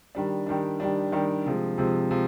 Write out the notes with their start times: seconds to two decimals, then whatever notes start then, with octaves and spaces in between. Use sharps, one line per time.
0.15 D#3 G3 D4
0.47 D#3 G3 D4
0.80 D#3 G3 D4
1.12 D#3 G3 D4
1.46 C3 F3 G#3
1.78 C3 F3 G#3
2.11 C3 F3 G#3